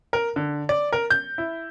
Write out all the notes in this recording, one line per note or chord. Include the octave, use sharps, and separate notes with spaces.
A#4
D3
D5
A#4
G6
E4